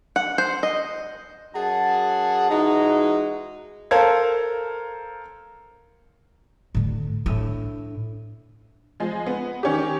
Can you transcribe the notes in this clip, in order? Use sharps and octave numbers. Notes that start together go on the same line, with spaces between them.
F#5
C5
D#5
F#2 G#4 F#5 A5
E3 G#3 D#4 F#4
A4 A#4 C5 F5 G#6
A2 D3
A2 D4 E6 D#7
F3 G#3
B3
D#3 C#4 G4